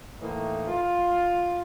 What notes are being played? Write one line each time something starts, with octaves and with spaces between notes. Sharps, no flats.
A2 E3 A#3 D#4
F4